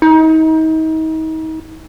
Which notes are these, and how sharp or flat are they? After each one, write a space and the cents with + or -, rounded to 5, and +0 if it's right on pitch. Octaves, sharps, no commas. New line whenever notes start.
D#4 +35